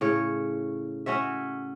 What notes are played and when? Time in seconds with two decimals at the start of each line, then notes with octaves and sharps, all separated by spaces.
0.01 A2 C#3 C#5
1.06 C#4 F#4 C#5 E5